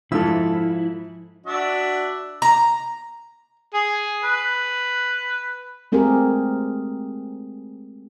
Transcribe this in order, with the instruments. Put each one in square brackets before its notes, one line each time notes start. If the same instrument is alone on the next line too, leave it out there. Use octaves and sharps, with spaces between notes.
[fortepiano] G#2 E6 [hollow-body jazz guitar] F3 F4 A4 [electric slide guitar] E4
[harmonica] D4 F#4 E5
[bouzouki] A#5
[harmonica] G#4
B4
[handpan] G#3 A3 C4 G4 G#4 A#4